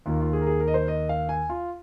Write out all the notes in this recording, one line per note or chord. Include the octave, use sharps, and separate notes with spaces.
D#2 D#3 A#3 F4
F4
G#4
A#4
G#4
A#4
D#5
C5
D#5
F5
G#5
F4